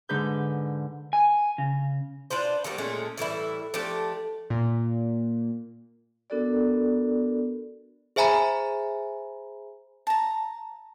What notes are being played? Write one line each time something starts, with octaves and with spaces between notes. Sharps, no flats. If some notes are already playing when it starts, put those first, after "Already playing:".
G#2 D3 D#4 B4 G6
G#5
C#3
D4 F4 B4 C5
D#3 F#3 G3 A#3
A#2 G#3 A3 C#4
A2 E3 G3 E4
F3 A3 D4 G4
A#2
B3 D4 F#4 A4 A#4 D5
G#4 C5 E5 G#5 A#5 B5
A5 A#5